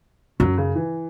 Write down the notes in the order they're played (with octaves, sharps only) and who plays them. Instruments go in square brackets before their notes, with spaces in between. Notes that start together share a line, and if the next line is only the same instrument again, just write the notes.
[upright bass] F#2 [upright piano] F#3
[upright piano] C#3
E3